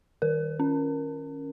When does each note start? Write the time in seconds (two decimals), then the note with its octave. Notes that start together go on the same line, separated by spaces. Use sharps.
0.22 D#3 A#4
0.60 C#4